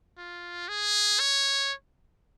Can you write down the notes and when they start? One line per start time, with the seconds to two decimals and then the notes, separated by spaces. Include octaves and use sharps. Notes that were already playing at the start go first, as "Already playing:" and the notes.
0.18 F4
0.69 G#4
1.20 C#5